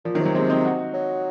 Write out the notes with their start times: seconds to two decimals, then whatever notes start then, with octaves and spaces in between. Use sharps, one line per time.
0.05 A#2 F3
0.15 D#3 F#3
0.20 C3
0.25 F#3 A#3
0.35 G#3 C4
0.49 C4 D#4
0.65 D#4 F#4
0.94 F#3